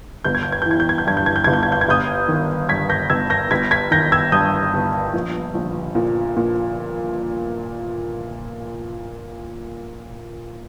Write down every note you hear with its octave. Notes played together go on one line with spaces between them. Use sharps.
G1 G6
G#6
G6
G#6
E3 G6
G#6
G6
G#6
G6
G2 G#6
G6
G#6
G6
G1 G#6
G6
G#6
G6
G#6
G1 D#6 G6
D#3
G2 G#6 B6
G6 A#6
G1 E6 G#6
G6 A#6
G1 G#6 B6
G#6 B6
D#3 G6 A#6
E6 G#6
G2 D#6 G6
G1
A#1
A#1
A#2
A#2